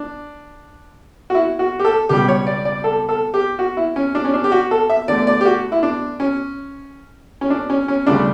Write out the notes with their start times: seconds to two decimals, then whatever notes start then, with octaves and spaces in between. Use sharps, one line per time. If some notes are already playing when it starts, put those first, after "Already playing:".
Already playing: D4
1.30 F#4
1.35 E4
1.59 F#4
1.79 G4
1.85 A4
2.09 C#2 B2 G3 G4
2.28 C#5
2.47 D5
2.65 D5
2.84 A4
3.09 A4
3.34 G4
3.59 F#4
3.77 E4
3.96 C#4
4.15 D4
4.25 C#4
4.34 D4
4.44 G4
4.52 F#4
4.71 A4
4.90 E5
5.08 E2 D3 A3 D5
5.27 D5
5.41 G4
5.45 F#4
5.72 E4
5.83 D4
6.20 C#4
7.41 C#4
7.50 D4
7.70 C#4
7.88 C#4
8.06 D2 C#3 G3 D4